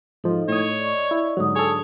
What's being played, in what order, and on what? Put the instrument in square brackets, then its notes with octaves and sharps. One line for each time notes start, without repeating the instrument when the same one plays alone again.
[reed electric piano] G#2 F3 [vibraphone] D#4 A4 D#5
[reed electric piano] A2 D#6 [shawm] C#5
[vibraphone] D5 D#5 C#6
[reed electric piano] E4
[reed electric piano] G#2 D3 F#3 [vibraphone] D4 D#6
[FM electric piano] G#4 A4 [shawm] C#5